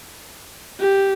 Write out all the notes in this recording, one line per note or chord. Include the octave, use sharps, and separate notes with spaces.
G4